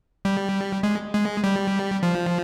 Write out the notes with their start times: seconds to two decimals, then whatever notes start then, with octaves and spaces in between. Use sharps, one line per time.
0.25 G3
0.83 G#3
1.13 G#3
1.44 G3
2.03 F3